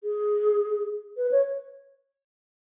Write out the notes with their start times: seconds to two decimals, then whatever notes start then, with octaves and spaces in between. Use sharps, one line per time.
0.04 G#4
1.17 B4
1.32 C#5